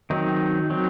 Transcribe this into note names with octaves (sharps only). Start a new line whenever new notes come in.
D#3 F#3 C4 D#4
F#3 C4